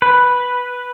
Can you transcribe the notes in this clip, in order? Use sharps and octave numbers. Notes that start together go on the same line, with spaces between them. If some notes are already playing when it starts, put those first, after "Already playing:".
B4